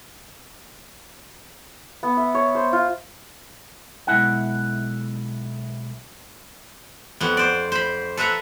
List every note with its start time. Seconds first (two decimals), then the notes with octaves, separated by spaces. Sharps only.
2.03 B3
2.17 E5
2.35 C#5
2.55 C5
2.73 F4
4.07 B1 G#3 E4 F#5
7.21 F2 B3
7.37 C5 D5
7.72 C5 B5
8.17 A4 B4 E5 F#5 A#5